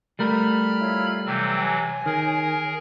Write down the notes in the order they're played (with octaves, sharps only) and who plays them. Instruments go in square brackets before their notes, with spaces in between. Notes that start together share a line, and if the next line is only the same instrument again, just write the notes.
[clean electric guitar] G3 A3 A#4 [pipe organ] B5 F6
[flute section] E4 F4 C#5
[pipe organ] C3 E3 F#3 [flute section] G5 C6 E6
[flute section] C#5 G#5
[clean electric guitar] D#3 [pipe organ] G#4 A#4